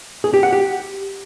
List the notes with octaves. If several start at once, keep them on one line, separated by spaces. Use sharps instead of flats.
G#4
G4
F#5
G4